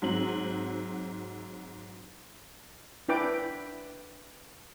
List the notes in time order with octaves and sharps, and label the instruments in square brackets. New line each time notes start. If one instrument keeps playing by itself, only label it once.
[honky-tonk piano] G#2 F#3 C4 F#7
[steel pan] D4 E4 B4 G5 D6